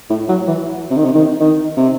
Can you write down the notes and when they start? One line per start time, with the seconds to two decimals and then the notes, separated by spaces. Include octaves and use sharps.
0.10 A2
0.29 F#3
0.47 E3
0.91 C3
0.97 D#3
1.05 C3
1.15 D#3
1.40 D#3
1.77 C3